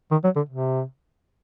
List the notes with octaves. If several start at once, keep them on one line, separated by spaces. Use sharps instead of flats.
D#3
F#3
D3
C3